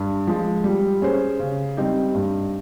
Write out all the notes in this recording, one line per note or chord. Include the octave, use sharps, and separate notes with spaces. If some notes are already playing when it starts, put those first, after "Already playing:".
Already playing: G2
F3 G#3
G3
C#4 G#4 C5
C#3
G3 C4 D#4 G4
G2